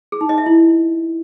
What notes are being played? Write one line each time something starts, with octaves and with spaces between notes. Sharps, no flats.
G#4
D#4
D#5
E5
E4